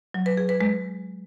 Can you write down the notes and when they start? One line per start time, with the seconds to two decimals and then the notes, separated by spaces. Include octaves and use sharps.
0.14 F#3
0.26 B4
0.37 G#4
0.49 B4
0.61 G#3